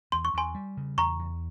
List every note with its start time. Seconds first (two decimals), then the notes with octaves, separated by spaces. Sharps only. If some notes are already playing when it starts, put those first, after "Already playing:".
0.12 E2 C6
0.25 C#6
0.34 E2 G#5 C6
0.55 G3
0.77 C#3
0.97 E2 A#5 C#6
1.19 E2